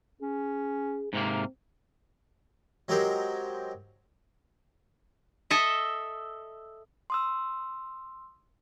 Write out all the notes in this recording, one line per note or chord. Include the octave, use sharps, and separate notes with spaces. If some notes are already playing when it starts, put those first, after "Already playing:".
C#4 G#4
G#2 C3 A#3 C4
F#3 G#3 C4 G4 A#4 C5
A4 D#5 E5
C6 D#6 E6